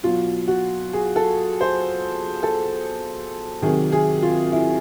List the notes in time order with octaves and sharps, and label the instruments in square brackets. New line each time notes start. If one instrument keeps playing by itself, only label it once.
[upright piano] B2 F#3 F4
F#4
G#4
A4
C5
A4
C3 D#3 F#3 G#4
G#4
F4
E4